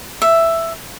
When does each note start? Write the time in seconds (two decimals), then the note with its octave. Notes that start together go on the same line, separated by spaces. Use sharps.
0.22 E5